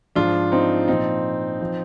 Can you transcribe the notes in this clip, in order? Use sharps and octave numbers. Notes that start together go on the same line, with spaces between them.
G#2 F3 D4 F4
C4 D#4
A#2 F3 C4 D#4
F3